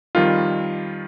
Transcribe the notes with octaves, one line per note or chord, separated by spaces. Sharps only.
F2 D#3 G3 F4